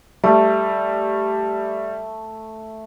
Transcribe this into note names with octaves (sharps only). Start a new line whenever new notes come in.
G3 A3